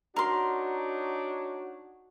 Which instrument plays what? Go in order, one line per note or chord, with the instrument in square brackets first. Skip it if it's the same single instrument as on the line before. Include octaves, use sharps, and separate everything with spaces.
[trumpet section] D4 D#4 C#5 [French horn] F#4 [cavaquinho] A#4 C6